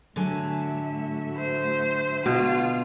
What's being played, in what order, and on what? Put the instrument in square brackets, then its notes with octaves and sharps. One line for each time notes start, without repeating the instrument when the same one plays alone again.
[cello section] A2 F#4 E5 [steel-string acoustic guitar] D3 F#3 G#5
[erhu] C5
[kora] B2 [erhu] F4